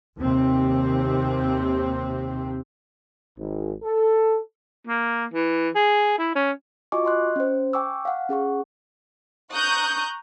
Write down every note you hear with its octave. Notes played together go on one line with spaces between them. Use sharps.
D#2 C3 C4
G#1
A4
A#3
E3
G#4
E4
C#4
F4 F#4 D#5 G#5 C#6 D6
D#5 C6 F#6
C#4 C5
G5 G#5 C#6 D6 E6
F5 F#5
C#4 G#4 F#5 C#6
A#5 C#6 D#6 F#6 G6